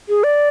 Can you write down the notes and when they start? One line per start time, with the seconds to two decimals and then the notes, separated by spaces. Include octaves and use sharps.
0.09 G#4
0.24 D5